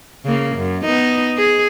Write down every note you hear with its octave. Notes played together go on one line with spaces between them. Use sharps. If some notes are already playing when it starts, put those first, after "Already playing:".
C#3 A#3
F#2
B3 D#4
G#4